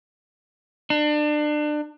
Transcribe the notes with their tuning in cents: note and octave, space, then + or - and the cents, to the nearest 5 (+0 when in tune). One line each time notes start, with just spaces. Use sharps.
D4 +30